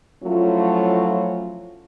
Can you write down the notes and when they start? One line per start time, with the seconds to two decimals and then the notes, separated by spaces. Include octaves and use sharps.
0.23 F3 F#3 A3 C#4 E4 F4